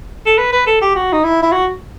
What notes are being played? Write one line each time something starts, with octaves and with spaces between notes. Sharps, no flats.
A4
B4
B4
A4
G4
F#4
D#4
E4
E4
F#4